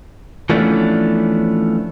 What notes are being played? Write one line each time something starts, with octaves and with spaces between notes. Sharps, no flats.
E3 F3 A3 B3 C#4 D4